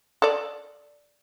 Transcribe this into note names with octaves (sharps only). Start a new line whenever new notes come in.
A4 D5